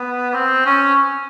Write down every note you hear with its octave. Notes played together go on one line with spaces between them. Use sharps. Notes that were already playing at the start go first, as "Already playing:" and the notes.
Already playing: B3
C4
C#4